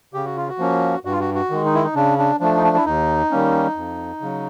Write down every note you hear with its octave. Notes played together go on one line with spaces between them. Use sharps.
C#3 G4
F#4
F4
F#4
F3 A#3 C#4
G2 F#4
F4
F#4
F#4
D#3 G#3
D#4
E4
D#4
C#3 D4
D4
F3 A3 D4
D#4
D4
E4
D#2 D#4
D#3 G3 A#3 C#4
F2
C#3 F#3